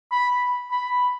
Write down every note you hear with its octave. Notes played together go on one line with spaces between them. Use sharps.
B5
B5